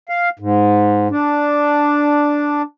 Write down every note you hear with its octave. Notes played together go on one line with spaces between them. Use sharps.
F5
G#2
D4